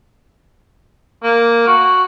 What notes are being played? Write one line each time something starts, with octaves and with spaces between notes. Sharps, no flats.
A#3
F#4